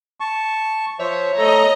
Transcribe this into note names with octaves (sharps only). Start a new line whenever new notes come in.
A5 C#6
F3 C5 C#5 E5
A3 A4 D#5 A#5